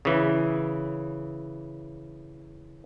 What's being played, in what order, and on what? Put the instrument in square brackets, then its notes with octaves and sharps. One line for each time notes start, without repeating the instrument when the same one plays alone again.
[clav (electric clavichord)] C#3 E3